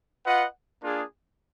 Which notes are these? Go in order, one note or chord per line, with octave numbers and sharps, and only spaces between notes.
F4 B4 D#5 F#5
A#3 D4 F4 G#4